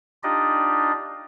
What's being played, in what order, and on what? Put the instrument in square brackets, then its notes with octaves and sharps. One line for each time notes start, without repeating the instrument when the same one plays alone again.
[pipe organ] D4 D#4 F4 G4 D5 D#5